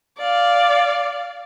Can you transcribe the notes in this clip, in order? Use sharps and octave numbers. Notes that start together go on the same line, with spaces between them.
D5 F5